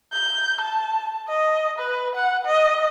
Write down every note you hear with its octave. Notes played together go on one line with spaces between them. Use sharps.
G6
A5
D#5
B4
F#5
D#5